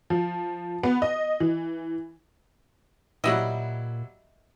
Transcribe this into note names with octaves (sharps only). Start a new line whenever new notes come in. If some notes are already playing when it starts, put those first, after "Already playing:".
F3
B3
D#5
E3
A#2 F#3 G3 E4 D#5 E5 F#5